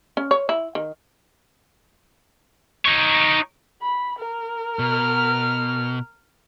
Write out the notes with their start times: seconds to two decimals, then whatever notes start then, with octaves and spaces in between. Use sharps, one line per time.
0.17 C#4
0.31 C#5
0.49 E4
0.75 D#3
2.85 D#4 C#5
3.82 B5
4.19 A#4
4.79 B2 F6